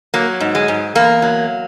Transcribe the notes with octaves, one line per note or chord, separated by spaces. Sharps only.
F#3 A#3
G#2
G#3
G#2
E2 A#3
F#3